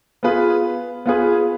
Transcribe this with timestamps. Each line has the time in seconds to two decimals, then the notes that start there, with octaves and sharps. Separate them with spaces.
0.23 B3 F4 G#4 B4
1.06 B3 F4 G#4 B4